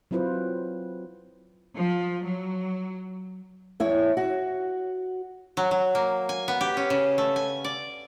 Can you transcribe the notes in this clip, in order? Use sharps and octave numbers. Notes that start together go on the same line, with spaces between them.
F#3 C4 E4 F4 B4 C5
F3
F#3
E2 E4 C#5
F#4
F#3
F#3
A#3
G#5
B3
G4
C#4
C#3
A3
G#5
D5